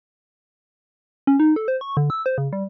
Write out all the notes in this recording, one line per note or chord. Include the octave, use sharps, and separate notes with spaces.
C#4
D#4
A4
C5
C#6
D3
E6
C5
C#3
G3